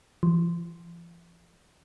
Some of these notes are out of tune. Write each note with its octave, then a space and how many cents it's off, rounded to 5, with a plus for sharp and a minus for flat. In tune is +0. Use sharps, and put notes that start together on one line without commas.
F3 -45